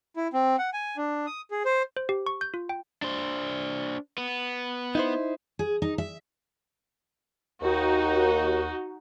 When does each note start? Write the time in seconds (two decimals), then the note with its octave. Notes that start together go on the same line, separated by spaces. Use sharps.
0.16 E4
0.33 C4
0.59 F#5
0.73 G#5
0.97 D4
1.26 D#6
1.51 G#4
1.65 C5
1.97 C5
2.09 G4
2.26 C#6
2.41 G6
2.54 F4
2.69 G5
3.02 D4 C5
4.18 B3
4.95 D#4 E4 C5
5.59 G#4
5.82 D#4
5.98 E5
7.62 D#2 D#4 F#4